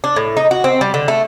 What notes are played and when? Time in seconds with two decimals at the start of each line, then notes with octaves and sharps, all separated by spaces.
0.04 D4
0.16 A2
0.37 D#4
0.51 F#4
0.64 C4
0.81 G3
0.94 D3
1.08 A3